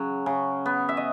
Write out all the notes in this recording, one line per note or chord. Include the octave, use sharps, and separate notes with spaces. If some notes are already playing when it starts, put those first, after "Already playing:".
Already playing: C#3 F#3
C#3
B3
E5
D#5